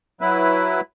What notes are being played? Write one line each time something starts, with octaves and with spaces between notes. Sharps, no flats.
F#3 E4 B4